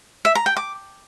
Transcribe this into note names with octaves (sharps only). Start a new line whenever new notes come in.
E5
A#5
G5
D6